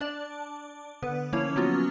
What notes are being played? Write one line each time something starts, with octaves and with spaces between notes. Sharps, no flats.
D4 D5 A5
D3 B3 B4
F3 A#3 C#4 E4 C#5
F#3 B3 C#4 F4 F#4